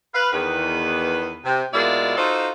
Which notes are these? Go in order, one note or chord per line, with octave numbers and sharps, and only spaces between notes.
B4 F5
E2 D#3 B4
C3
B2 G#3 A#3 E4 F4 D5
D#4 F4 F#4 A4 C5